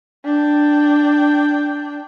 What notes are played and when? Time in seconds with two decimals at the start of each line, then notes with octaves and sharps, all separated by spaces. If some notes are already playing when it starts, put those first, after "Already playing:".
0.25 D4 G5